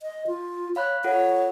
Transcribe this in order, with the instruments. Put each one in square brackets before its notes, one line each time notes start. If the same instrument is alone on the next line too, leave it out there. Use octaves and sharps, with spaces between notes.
[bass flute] D#5
F4
[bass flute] C#5 [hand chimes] F5 B5 F#6
[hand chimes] F4 A4 F#5 [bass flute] C#5